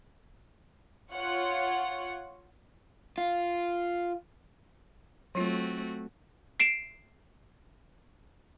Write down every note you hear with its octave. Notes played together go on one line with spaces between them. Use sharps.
F4 C#5 F#5
F4
F#3 A3 C4 F4 F#4
C7 D7 E7